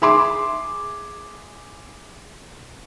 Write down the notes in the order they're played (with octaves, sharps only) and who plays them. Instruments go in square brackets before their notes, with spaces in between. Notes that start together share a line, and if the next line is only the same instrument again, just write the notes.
[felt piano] G#4 E5 C6 D6